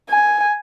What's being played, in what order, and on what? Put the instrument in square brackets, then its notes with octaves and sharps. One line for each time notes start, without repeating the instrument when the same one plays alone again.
[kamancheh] G#5